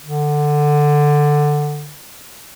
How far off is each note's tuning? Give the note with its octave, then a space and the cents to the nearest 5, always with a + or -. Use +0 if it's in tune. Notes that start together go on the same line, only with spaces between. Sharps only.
D3 +10